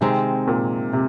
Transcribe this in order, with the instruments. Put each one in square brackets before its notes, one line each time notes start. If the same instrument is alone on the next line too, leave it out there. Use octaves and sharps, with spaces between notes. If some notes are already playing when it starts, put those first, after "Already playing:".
[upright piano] C3 [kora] D#3 G#3 C4
[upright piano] A#2
C3